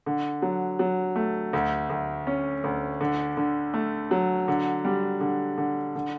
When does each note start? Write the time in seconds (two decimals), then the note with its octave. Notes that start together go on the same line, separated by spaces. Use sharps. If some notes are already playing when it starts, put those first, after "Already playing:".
0.06 D3
0.42 F#3
0.79 F#3
1.16 A3
1.53 D2
1.90 D2
2.27 C#4
2.64 D2
3.01 D3
3.37 D3
3.74 A3
4.11 F#3
4.48 D3
4.85 G3
5.21 D3
5.58 D3
5.95 D3